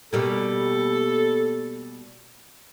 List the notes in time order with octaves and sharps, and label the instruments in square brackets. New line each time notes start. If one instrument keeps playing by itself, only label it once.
[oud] B2 G3 A#3 [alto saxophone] A4